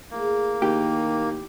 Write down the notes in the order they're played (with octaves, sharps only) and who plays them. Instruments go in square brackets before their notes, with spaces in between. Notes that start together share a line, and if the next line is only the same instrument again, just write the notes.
[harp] A3 E4 G#4 [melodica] A#3
[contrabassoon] D#2 [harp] B3 E4 B5 [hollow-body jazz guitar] G4